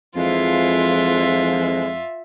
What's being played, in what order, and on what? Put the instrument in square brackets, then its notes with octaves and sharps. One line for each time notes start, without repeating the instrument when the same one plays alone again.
[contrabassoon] F2 [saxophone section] E3 F3 G#3 [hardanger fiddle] F4 E5